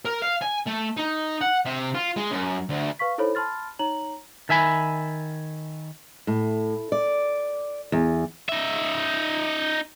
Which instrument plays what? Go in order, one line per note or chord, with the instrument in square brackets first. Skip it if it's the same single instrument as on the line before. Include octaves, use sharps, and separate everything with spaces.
[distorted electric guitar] A#4
F5
G#5
A3
D#4
F#5
C3
F4
G#3
F#2
D2
[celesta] B4 F5 C#6 B6
D#4 E4 A4 C5 C#5 B5
A5 B5 C6 F6 A6
D#4 C#5 A#5 F#7
[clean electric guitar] D#3 E5 G#5 B5
[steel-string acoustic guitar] A2
D5
E2
[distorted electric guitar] D#4 E5